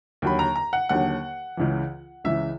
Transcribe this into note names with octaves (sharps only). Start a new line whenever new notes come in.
D#2 D3 F#3 B5
A#5
A#5
F#5
D#2 D3 F#3 F#5
C#2 C#3 E3
C#2 C#3 E3 E5